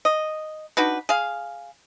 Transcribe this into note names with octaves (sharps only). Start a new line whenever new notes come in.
D#5
D4 D#4 F#4 B4
G#4 F5